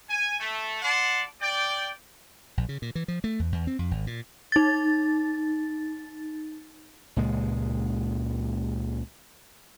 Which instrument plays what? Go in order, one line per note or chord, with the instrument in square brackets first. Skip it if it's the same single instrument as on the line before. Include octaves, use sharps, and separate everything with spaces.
[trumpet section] G#5
A3
D5 F#5 A5 C6
D5 G5
[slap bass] A#1
C#3
A#2
E3
F3
A3
E2
E2
C4
F2
G#1
A#2
[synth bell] D#4 A6
[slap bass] C#2 A#2 G#3